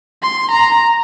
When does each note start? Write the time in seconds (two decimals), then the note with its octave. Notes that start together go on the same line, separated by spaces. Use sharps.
0.22 C6
0.51 A#5